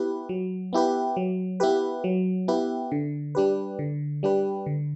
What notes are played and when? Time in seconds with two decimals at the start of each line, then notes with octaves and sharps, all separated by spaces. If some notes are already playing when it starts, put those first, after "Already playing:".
Already playing: B3 E4 G4 B4
0.29 F#3
0.73 B3 E4 G4 B4
1.17 F#3
1.60 B3 E4 G4 B4
2.04 F#3
2.48 B3 E4 G4 B4
2.92 D3
3.35 G3 D4 G4 B4
3.79 D3
4.23 G3 D4 G4 B4
4.66 D3